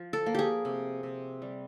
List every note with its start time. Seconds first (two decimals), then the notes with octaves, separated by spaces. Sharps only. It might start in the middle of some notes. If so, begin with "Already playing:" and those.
Already playing: F3
0.13 A4
0.26 A#3
0.35 G4 G#4
0.65 C3
1.03 C3
1.42 G3